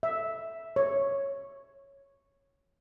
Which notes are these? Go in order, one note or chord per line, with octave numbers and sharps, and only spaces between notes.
E5
C#5